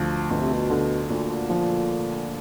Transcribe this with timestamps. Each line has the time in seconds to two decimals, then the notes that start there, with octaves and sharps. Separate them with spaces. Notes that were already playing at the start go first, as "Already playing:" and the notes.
Already playing: D2 F3
0.29 D2 B2
0.41 C3
0.52 B2
0.70 D3
1.10 D2 A#2
1.50 F3